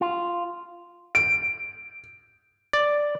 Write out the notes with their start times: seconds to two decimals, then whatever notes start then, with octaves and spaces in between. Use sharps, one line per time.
0.01 F4
1.15 D7
2.73 D5